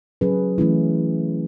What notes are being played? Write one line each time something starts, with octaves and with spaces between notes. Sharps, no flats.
F#3 C#4 G#4 B4
E3 A3 C#4 E4